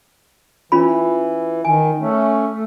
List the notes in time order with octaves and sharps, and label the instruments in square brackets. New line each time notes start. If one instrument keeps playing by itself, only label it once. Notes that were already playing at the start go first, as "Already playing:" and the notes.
[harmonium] E3 [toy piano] C#4 F4 B5
[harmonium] D#3 [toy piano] G#5
[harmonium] A3 C#4
A3